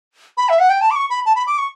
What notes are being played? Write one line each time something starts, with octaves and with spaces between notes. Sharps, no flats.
B5
E5
F#5
G5
A5
D6
C#6
B5
A5
B5
D6
C#6